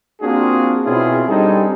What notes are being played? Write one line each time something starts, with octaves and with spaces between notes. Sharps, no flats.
A#3 C4 D4 F4 F#4 G#4
B2 C4 C#4 E4 F4 G#4
G3 C4 D4 D#4 G#4 A4